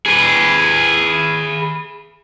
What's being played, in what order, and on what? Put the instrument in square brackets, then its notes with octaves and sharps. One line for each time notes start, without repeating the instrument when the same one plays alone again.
[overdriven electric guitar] G#4 B4